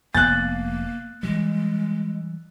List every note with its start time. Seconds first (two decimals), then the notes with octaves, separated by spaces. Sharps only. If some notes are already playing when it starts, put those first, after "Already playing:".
0.15 F1 A#3 B3 F#6 A6
1.23 E3 G3 G#3